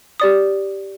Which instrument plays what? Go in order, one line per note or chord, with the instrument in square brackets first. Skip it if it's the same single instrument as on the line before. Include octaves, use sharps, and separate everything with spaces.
[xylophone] G4 D5 D#6